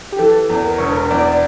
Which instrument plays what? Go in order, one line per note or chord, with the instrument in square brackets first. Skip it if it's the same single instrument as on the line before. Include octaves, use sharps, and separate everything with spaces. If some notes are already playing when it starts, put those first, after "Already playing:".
[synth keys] G4
[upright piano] E3 [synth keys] A4
[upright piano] E2
[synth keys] A#4
[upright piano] E1 [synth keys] C#5
[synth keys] A#4
[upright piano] E2 [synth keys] D5